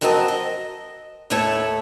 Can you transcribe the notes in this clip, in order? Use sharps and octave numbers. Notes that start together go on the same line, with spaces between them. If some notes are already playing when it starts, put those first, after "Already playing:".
F2 F#3 C4 A#4 D#5 A5
D#5
D#2 A2 A3 E4 C#5 A5